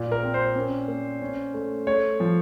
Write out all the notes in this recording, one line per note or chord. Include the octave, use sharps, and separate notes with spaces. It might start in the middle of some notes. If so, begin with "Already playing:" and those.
Already playing: A#2 A#3
A#4
C4
C5
C#4
A#3
C#4
A3
A3 C#5
F3